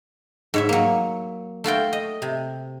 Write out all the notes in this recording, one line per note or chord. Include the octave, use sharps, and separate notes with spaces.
G#2 C#5 E5
F#3 A#3
A3 F4 F#4 G5
D#5
C3